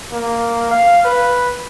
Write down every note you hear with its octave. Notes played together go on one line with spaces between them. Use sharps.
A#3
F5
B4